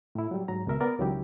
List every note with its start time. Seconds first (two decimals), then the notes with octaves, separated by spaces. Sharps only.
0.15 A2 E4
0.31 F#3 G3
0.48 G#2 F#3 A#5
0.67 C#2 B2 A#4 E5
0.80 B3 A#4 D5
0.98 C#2 D#3 F#3 C#4 E4 G4